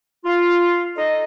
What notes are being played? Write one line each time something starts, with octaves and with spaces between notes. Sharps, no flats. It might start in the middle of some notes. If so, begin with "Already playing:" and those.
F4
D#4 A4 D#5